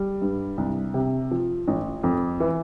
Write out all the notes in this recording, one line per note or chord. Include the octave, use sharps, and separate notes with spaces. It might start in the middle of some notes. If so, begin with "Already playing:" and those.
Already playing: G3
G2
C2
C3
F3
A1
F2
E3